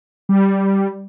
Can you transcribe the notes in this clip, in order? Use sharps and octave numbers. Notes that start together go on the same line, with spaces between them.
G3